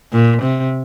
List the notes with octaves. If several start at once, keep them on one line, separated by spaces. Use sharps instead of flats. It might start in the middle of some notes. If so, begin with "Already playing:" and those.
A#2
C3